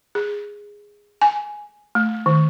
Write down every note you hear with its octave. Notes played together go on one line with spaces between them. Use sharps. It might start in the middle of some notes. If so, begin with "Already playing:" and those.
G#4
G#5
A3
D#3